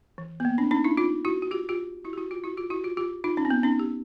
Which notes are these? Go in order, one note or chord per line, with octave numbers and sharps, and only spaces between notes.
E3
B3
A#3
C4 D4
C#4 D#4
D4 E4
D#4 F4
E4 F#4
F#4
F4 G4
F4 G4
E4 F#4
G4
E4 F#4
F4 G4
E4 F#4
F4 G4
E4 F#4
F4 G4
F4 G4
D#4 F4
C#4 D#4
C4
B3
C#4 D#4
G4